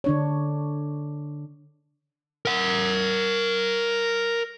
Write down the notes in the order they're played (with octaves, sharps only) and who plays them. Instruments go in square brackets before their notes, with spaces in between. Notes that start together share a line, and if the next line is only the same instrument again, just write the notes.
[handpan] D3 D4 C#5
[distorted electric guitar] A#4 F#5